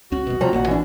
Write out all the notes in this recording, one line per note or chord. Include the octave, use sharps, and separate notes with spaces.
C#2 C#4 F#4
F#1 C2 B2
C3 F3 G3 A#5
A1 D#2 A#2 F#5
E3 D4